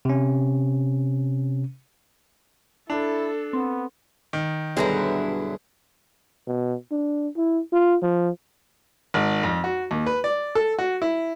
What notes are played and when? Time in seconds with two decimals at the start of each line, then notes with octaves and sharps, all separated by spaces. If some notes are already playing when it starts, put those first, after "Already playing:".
0.05 C3 C#4
2.90 D4 E4 A4
3.53 B3 C4
4.33 D#3
4.77 B1 G2 D3 F#3 E4 G#4 A#5
6.47 B2
6.91 D4
7.36 E4
7.73 F4
8.02 F3
9.14 G#1
9.43 F2
9.64 F#4
9.91 D#2
10.06 B4
10.24 D5
10.55 A4
10.79 F#4
11.02 E4